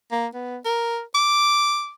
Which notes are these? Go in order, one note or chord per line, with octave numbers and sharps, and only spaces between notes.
A#3
B3
A#4
D6